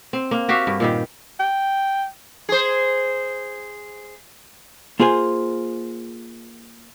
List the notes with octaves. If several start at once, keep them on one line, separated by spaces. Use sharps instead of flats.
C4
A#3
F#4 G4 E5 F5
G2
A#2 D#3 G3
G5
G#4 C5
A#3 F4 G#4 C5 G#5